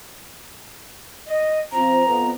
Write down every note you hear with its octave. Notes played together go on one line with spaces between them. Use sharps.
D#5
F3 C4 A#5
F2 B3